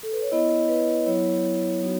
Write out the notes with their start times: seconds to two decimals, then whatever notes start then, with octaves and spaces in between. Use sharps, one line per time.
0.03 A4
0.13 B4
0.22 C#5
0.32 B3 E4 D#5
0.69 B4
1.06 F#3 B3 E4 C#5
1.80 F#3 B3 D#4 F#4